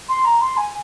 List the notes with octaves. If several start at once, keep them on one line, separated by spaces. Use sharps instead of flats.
C6
A#5
C6
G#5